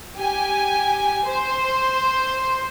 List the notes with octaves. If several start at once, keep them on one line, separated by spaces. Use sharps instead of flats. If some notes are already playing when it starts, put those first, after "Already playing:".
G4 G#5
C5